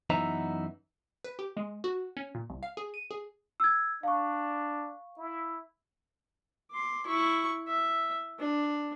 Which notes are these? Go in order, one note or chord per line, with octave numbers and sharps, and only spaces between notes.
F#2 E3 B3 D#4 E5 A#5
B4
G4
G#3
F#4
C#4
A#2
C2
F5
G#4
D#7
G#4
E6 G#6
D4 F5 C#6
E4
C6 D6
E4 C#6
E5
D4